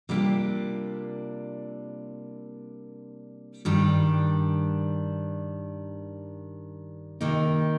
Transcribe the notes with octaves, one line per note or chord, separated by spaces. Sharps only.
C3 G3 A#3 D4 F4
G2 D#3 G3 D4
C3 D#3 A#3 D#4